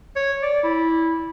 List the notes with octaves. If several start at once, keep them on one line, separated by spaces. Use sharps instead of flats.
C#5
D5
E4